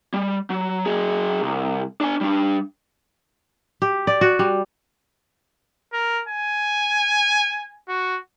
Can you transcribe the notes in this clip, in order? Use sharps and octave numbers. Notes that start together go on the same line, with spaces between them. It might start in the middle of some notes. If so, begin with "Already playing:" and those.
G3
F#3
F#3 G#4
C2
D4 G#5
G3 D4
G4
D5
F#4
G3
A#4
G#5
F#4